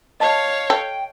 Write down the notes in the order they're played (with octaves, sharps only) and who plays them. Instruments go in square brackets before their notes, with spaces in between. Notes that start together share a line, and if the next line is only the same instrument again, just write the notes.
[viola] C#5 F5 [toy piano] D#5 A5
[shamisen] A4 [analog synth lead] G5